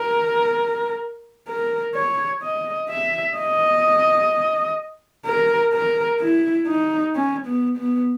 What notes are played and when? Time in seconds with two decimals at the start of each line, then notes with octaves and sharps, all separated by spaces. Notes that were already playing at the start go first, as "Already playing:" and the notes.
Already playing: A#4
1.48 A#4
1.95 C#5
2.42 D#5
2.90 E5
3.37 D#5
5.26 A#4
5.73 A#4
6.20 E4
6.67 D#4
7.15 C#4
7.46 B3
7.77 B3